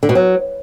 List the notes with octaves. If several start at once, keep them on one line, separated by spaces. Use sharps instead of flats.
D3
B2
F#3